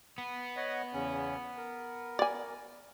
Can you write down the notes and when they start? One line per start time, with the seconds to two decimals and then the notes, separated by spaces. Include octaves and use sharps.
0.18 B3
0.57 C#5 D#5 F#5
0.93 E2 C#3 C#4
1.57 A#4
2.19 D5 G#5